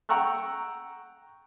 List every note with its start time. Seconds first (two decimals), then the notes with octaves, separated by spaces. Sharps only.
0.09 F#5 G5 A#5 C#6 E6 F#6